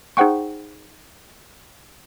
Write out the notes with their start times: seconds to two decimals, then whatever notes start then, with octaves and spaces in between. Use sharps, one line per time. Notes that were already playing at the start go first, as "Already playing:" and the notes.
0.17 D#4 G#4 C5 F#5 G5 C#6